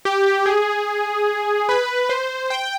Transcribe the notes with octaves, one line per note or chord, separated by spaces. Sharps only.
G4
G#4
B4
C5
G5